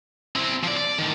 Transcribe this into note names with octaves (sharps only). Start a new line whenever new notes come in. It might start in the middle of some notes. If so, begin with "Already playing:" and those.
C4 E4
F3 D5
D5
A2 D#3